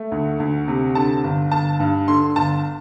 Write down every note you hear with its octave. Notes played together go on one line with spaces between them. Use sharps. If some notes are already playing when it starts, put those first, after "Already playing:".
Already playing: A3
D2
D2
C3
D3 A5
G1
G1 A5
G2
D3 C6
G1 A5